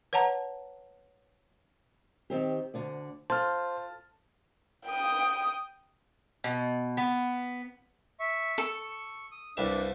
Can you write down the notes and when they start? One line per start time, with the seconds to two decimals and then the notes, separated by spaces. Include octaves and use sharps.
0.13 B4 C#5 F#5 A5 A#5
2.30 D#3 C4 G4
2.74 D2 D3 D5
3.30 F4 A4 C5 A5 F6
4.87 G5 D#6
6.44 B2
6.97 B3
8.20 E5 C#6
8.58 A4 C#6
9.32 D#6
9.57 C2 G2 D4 E5